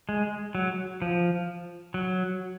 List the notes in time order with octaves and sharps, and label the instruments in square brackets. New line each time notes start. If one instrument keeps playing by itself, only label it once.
[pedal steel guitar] G#3
F#3
F3
F#3